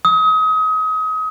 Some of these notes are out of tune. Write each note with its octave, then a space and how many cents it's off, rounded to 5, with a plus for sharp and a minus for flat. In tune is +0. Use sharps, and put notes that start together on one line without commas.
D#6 +30